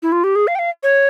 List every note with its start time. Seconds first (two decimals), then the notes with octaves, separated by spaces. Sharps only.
0.03 E4
0.12 F4
0.24 G4
0.36 G#4
0.47 F5
0.55 G5
0.59 F5
0.83 C#5